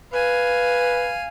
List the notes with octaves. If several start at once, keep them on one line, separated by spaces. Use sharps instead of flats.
B4 F5 G#5